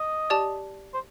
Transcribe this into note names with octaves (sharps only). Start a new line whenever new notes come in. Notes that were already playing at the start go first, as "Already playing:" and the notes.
Already playing: D#5
G4 D5 A5
C5